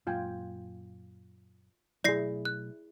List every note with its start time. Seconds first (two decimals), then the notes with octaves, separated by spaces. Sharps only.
0.07 F#2 A#2 F4 G5 G#5
2.04 B2 F#3 A3 E4 G#4 D5 A#6 C7
2.45 F#6